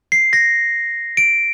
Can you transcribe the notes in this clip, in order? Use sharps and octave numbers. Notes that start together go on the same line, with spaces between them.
C7
A#6
D7